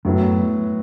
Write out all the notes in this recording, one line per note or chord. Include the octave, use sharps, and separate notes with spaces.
F#2 A2 F#3 B3 E4